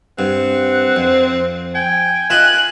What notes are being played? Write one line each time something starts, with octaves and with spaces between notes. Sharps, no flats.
G2 C4 F#5
F2
G5 G#5
F4 D#5 E5 F#6